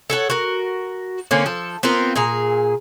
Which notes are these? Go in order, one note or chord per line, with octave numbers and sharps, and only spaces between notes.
A4 C#5 F#5
F#4 A#4
D3 A#3 C4 C#4
F3 A4
B3 C4 F4 A#4
A#2 G#4 A#5